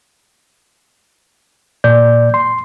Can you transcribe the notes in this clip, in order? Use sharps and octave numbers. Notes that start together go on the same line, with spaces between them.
A#2 D5 G6
C6